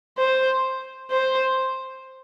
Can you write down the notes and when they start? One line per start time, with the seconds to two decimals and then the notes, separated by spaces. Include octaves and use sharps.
0.18 C5
1.10 C5